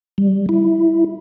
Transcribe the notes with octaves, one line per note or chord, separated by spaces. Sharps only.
G3
E4